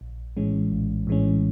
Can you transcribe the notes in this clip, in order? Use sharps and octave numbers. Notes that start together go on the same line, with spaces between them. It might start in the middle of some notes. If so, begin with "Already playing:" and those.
A#1
A2 E3 G#3 C#4
A#1
A2 E3 G#3 C#4